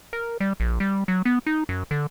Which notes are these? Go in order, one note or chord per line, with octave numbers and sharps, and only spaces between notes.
A#4
G3
A#1
G3
F#3
B3
D#4
F#2
D3